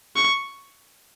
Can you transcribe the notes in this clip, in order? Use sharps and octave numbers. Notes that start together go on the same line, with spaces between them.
C#6